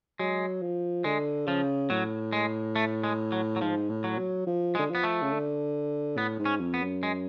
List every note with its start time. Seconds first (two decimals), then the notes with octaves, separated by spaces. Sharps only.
0.19 F#3 G#3
0.62 F3
1.04 D3 G#3
1.47 C#3 F3
1.90 A2 F#3
2.33 G#3
2.76 A3
3.04 G#3
3.32 F#3
3.56 F#3
3.61 G#2 F3
3.89 A2
4.04 F#3
4.18 F#3
4.47 F3
4.75 G#3
4.79 D3
4.90 F3 B3
5.03 A3
5.22 C#3
5.32 D3
6.17 A2 B3
6.39 G#2
6.45 C#4
6.60 F2
6.74 B3
6.81 F#2
7.03 G#3